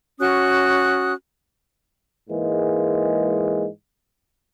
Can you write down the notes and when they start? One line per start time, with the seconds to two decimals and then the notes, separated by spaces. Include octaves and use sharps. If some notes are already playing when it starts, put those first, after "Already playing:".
0.20 C#4 F#4 D#6 F#6
2.30 G#2 E3 G#3 A#3